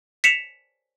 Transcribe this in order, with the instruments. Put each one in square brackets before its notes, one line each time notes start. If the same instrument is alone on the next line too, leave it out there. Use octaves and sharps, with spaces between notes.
[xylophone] B6 C#7 E7 F7